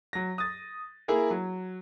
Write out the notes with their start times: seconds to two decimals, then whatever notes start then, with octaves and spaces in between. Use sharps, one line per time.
0.13 F#3 A#6
0.38 D#6 A6
1.08 A#3 E4 G#4 A#4
1.31 F#3